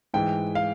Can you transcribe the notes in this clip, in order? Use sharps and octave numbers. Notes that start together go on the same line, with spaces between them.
G#2 E3 G#3 G5
F5